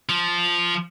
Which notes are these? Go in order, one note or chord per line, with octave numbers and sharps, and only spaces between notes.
F3